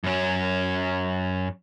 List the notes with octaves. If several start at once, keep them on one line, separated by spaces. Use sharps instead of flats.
F#2 C#4